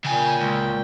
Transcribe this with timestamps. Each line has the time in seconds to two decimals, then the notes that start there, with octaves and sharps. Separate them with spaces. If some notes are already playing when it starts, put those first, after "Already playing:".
0.05 A#2 C#3 G5 G#5
0.40 C#2